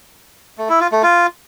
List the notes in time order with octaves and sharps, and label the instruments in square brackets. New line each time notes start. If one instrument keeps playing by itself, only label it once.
[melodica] A3
E4
F4
A3
F4